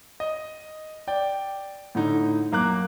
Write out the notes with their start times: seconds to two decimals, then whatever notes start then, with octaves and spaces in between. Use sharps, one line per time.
0.20 D#5
1.07 D5 G5
1.95 A2 D3 D#4
2.52 F#2 A#3 A#5 D6 F#6